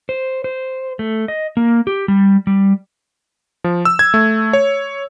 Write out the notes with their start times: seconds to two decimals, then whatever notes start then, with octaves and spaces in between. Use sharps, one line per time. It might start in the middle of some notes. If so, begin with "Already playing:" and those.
0.09 C5
0.44 C5
0.99 A3
1.28 D#5
1.57 A#3
1.87 G4
2.08 G3
2.47 G3
3.64 F3
3.85 E6
3.99 G#6
4.14 A3
4.53 C#5